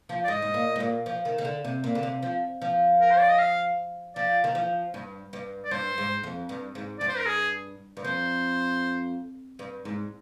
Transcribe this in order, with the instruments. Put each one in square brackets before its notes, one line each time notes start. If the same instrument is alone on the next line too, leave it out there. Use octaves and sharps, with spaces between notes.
[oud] F3
[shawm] D5
[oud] G#2 [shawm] D#5
[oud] G#2
A#2
G#2
A#2
F3
D#3
D#3
D3
C3
A#2
D3
C3
F3
F3
[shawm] A#4
C5
D5
D#5
F5
[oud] F3 [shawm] D5
[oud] D#3
F3
G2
G2
[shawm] D5
[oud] G2 [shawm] C5
[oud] G#2
F2
G2
G#2
[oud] G2 [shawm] D5
[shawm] C5
A#4
G#4
[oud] G2
[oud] F2 [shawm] C5
[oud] G2
G#2